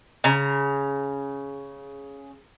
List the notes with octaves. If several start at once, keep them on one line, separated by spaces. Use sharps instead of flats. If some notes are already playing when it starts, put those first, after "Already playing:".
C#3 A#5